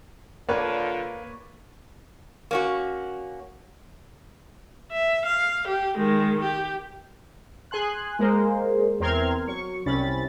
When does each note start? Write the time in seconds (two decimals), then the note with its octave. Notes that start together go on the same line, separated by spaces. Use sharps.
0.49 D3 A#3 F4 B4 C#5 D5
2.51 A#3 C#4 F#4
4.92 E5
5.26 F5
5.68 G4
5.98 D#3 G#3
6.43 G4
7.71 G#4 G#5 C6 F#6
8.19 G#3 A#3 G#4 A#4 C5
9.00 E2 C4 A#4 C6 F6 G#6
9.48 F#3 C#6
9.86 C2 C3 C#4 B5 A6